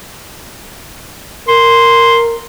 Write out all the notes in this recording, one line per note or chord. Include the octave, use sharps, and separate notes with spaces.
A#4 C6